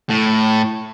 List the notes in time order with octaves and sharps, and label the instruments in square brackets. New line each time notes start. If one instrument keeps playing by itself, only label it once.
[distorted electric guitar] A2